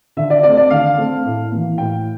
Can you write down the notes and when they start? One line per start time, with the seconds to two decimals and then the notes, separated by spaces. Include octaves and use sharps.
0.17 D3 E5
0.30 D5
0.43 A3 C4 D5
0.57 D5
0.70 D3 F5
0.98 A3 C4
1.25 A2
1.51 E3 A#3
1.78 A2 G5